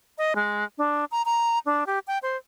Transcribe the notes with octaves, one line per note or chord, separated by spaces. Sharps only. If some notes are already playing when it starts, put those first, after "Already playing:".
D#5
G#3
D4
A#5
A#5
D4
G4
G5
C5